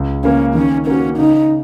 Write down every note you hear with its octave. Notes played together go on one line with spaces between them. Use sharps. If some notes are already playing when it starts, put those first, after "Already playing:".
Already playing: C#2
C#3 A#3 C#4
D#3 C#4
A#3 C#4 F#4 A#4
C#3 D#4